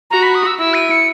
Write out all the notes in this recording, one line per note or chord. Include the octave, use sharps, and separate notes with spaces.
F#4 A#5
B5
D#6
E6
E4 E6
D#7
C#7